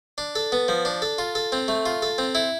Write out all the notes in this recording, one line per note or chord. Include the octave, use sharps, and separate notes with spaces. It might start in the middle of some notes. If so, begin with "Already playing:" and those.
D4
A4
B3
F3
D4
A4
F4
A4
C4
A3
F4
A4
C4
E4